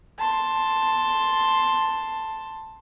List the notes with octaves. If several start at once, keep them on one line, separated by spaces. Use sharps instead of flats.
A5 C6